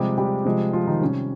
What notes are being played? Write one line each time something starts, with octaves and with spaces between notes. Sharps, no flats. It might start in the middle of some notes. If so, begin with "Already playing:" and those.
Already playing: C3 F3 G3 G#3 G4
G3 G4
C3 F3 G#3
F3 F4
D#3 D#4
C3 G3 C#4